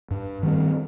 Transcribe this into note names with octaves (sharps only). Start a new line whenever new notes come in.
G2
D#3 G3 C4